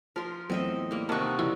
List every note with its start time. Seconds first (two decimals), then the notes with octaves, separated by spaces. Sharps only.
0.16 F3 A#4 C6
0.50 E2 A2 F#3 C4 D#5 E5
0.91 G3 A#3
1.09 D#2 C3 D#3 F#4 A5 C#6
1.39 E2 C#3 F3 G3 E4